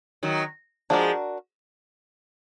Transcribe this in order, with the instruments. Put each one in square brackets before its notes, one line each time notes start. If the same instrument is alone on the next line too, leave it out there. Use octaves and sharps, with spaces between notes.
[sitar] D#3 F#3
[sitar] F3 G#3 [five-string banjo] D4 F#4 A#4 D5